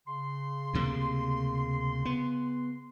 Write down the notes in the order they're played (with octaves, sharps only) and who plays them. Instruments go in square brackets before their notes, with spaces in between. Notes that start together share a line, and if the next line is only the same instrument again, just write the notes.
[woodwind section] C#3 C6
[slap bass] D2 C3 A#3
B3